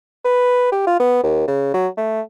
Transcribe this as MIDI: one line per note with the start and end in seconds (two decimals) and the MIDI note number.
0.25 0.71 71
0.72 0.83 67
0.87 0.98 65
1.00 1.18 59
1.23 1.47 39
1.48 1.71 49
1.74 1.88 54
1.97 2.21 57